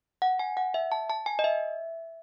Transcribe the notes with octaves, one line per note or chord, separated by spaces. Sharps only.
F#5
G#5
F#5
E5
A5
A5
G#5
D#5
E5